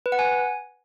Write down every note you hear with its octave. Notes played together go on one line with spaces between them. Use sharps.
B4
F#5
G#5